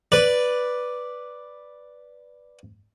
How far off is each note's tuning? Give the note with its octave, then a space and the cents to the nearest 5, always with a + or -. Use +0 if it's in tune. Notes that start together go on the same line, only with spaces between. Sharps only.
B4 +0 D5 +0